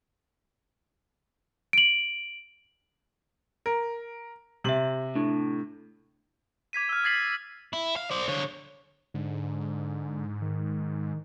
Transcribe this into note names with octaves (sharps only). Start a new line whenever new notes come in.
D7 F#7
A#4
C3 G4 E5 F#7
A2 D4
D6 G#6 B6 D#7
E6 F6
D#6 G#6 A6 B6 C7 F#7
D#6
E4
F5
C5 D5
D3 C#5
G#2 D3
D#3